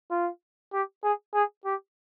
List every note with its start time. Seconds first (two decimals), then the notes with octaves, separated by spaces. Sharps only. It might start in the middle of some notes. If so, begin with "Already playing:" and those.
0.11 F4
0.73 G4
1.03 G#4
1.34 G#4
1.65 G4